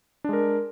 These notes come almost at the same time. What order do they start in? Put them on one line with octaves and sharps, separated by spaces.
D4 G#3 A#4